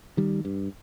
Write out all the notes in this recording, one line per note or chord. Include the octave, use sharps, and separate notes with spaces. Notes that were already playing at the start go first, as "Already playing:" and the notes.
D#3 G3
G2